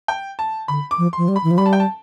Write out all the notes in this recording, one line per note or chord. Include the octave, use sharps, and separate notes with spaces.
G5
A5
D3 B5
D6
F3
F3 C6
G3
B5
E3
F3
G3 B5
A5
G5
A5